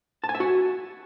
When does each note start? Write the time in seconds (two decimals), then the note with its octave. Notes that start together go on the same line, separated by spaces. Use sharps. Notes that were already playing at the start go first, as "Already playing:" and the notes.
0.24 A5
0.29 G#5
0.35 E5
0.40 F#4